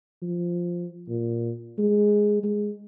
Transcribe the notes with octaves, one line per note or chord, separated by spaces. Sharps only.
F3
A#2
G#3
G#3